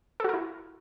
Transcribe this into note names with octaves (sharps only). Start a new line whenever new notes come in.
E4 F#4 A4 A#4